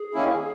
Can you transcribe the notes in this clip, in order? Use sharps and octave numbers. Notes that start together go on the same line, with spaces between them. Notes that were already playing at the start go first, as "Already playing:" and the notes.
Already playing: G#4
D#2 D#3 A#3 C#4 E4